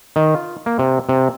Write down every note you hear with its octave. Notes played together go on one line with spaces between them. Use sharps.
D#3
F4
A#3
C3
C3